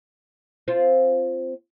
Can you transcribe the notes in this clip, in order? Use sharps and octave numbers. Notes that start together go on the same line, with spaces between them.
C4 F4